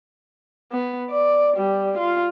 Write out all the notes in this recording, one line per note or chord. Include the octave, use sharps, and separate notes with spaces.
B3
D5
G3
F4